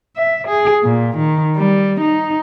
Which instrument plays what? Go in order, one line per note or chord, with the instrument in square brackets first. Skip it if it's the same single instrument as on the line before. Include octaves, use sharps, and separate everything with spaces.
[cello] E5
G#4
A#2
D#3
G3
D#4